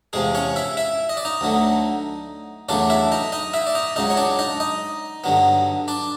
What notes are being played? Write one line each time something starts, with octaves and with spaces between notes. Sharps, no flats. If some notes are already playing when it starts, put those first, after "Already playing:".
E2 C3 F3 G#3 G#4
C#4 C#5
E4 E5
E4 E5
D#5
D5
D#4 D#5
D2 D3 F#3 A3
E2 C#3 F#3 A3 D4 D5
E4 E5
D#4 D#5
D#4 D#5
E4 E5
D5
D#4 D#5
C#2 C#3 F#3 D#4 D#5
C#5
D4 D5
D#4 D#5
D#4 D#5
G2 D3 F#3 B3
D4 D5